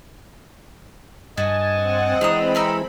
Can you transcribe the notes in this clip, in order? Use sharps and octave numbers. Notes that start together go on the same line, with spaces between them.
G2 F#4 D#5 G#5 A5
C4 F#5
E3 G#3 C4 D4 A#5 B5 D#6
A4 A#4 E6